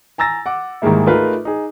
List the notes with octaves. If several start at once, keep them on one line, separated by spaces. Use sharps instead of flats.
G#5 A#5 E6 A6 A#6
F#5 D6
G#2 D#3 G3 G#3 A#3 E4
A3 D#4 F4 G#4 A#4 B4
D#4 G#4